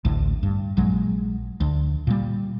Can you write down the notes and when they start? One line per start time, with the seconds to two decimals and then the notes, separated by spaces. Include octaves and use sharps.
0.05 A1 D2 A2
0.43 G2
0.77 A#1 F#3 G#3
1.60 D2
2.07 A#2 G3